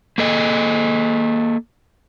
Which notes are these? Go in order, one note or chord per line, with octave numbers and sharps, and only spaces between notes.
A#3 A4 D#5